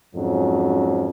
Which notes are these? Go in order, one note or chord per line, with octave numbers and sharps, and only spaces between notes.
F2 G#2 F#3 C#4